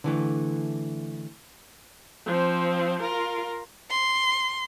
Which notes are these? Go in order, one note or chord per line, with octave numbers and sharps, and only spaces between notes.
D3 E3 A3
F3 C4
F4 A#4
C6